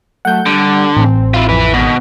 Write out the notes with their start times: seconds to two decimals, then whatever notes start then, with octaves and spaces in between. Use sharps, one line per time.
0.25 F#3 A3 F#5 G6
0.46 D3 G3
0.97 A1 C4
1.34 E4 F4
1.49 F2 E4 B4
1.74 G#1 B2